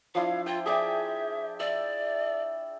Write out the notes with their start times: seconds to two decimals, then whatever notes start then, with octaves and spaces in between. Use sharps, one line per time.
0.15 F3 D4 E4 F5
0.46 F4 G5
0.66 G#4 D5 E5 G5
1.60 D5 E5